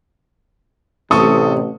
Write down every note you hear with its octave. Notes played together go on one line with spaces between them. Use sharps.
A1 C3 A4 C#6 D#6